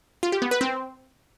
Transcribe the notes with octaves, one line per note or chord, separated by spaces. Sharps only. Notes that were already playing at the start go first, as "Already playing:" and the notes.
F4
G4
B3
B4
C4